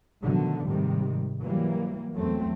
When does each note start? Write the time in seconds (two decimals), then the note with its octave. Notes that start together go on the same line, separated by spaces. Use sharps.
0.24 B2 D3 D#3 F3 F#3 A3
0.65 G#2 C3 D#3 G3
1.43 E3 F#3 G3 A#3
2.14 E2 F#3 A3 C4